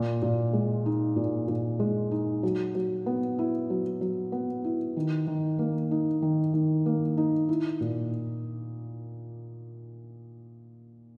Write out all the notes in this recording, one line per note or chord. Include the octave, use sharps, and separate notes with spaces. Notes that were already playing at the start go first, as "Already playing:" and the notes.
Already playing: A#2
A#2
G#3
D#4
A#2
A#2
G#3
D#4
F#3
F#3
B3
E4
F#3
F#3
B3
E4
D#3
D#3
A#3
D#4
D#3
D#3
A#3
D#4
E4
A#2